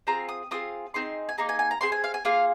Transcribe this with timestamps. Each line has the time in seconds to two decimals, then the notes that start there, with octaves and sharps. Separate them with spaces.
0.07 C4 F4 G#4 A#5
0.29 D#6
0.51 C4 F4 G#4 D#6
0.94 C4 D#4 G#4 C6
1.29 G#5
1.38 A#3 D#4 G#4 A#5
1.49 G#5
1.59 G#5
1.71 A#5
1.81 C4 G#4 C6
1.92 G#5
2.04 F5
2.14 G#5
2.25 A#3 F4 G#4 F5